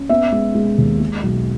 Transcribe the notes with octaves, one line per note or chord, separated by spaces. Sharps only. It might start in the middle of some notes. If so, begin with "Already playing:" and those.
Already playing: C#4
B3 E5
G#3
G#3
D#2
G#3
B1